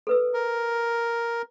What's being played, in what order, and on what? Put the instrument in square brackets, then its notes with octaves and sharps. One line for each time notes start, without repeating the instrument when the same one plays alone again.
[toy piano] A4 B4 E6
[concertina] A#4